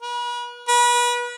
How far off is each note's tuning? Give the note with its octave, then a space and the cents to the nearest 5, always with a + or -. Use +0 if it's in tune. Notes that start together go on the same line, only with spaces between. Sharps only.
B4 -40
B4 -30